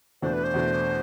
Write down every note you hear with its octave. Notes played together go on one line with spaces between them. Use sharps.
E2 B2 A3 D4 C5
B4
C5
E2 B2 A3 D4